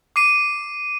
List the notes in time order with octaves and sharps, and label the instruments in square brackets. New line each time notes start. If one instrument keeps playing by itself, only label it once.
[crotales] D6 C7 D#7